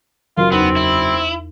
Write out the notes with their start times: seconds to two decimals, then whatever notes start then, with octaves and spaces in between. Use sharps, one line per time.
0.37 F#1 F#3 F4 A#4
0.52 E2 B3 C4 D#4
0.76 E4